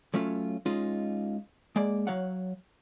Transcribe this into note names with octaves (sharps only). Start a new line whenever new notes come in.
F#3 A3 C#4 F4
G#3 C#4 D#4 F4
G#3 A#3 D5
F#3 C#5 F5 F#5